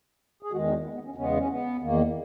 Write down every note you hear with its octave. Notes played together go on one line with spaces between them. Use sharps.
G#4
E2 D#3 G#3 F#4
D#4
B3
B3
C#4
E2 C#3 G#3 B3 C#4
C#4
B3
E2 D#3 A#3